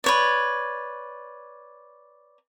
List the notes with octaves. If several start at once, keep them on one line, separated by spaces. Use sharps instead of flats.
B4 C#5 D5